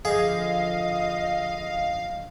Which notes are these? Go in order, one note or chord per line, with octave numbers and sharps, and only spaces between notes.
D3 F3 G#4 D#5 F5